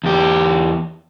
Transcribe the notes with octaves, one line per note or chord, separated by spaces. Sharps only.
E2 G4